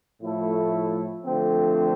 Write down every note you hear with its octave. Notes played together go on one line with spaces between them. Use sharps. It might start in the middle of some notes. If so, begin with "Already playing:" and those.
A2 F3 A3 E4 A4
D3 F3 A3 C4